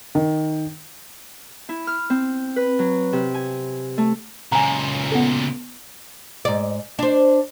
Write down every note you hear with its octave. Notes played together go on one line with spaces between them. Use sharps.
D#3
E4
F6
C4
B4
F#3
C3
G#5
A3
C#2 A#2 G#5 A#5
B3 A4
G#2 D5
D4 C5